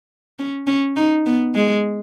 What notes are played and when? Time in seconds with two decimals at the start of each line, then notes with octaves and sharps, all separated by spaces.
0.39 C#4
0.67 C#4
0.96 D#4
1.26 B3
1.55 G#3